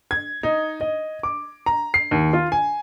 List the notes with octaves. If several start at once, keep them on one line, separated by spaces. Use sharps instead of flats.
G#6
D#4
D#5
D6
A#5
C7
D#2
F4
G#5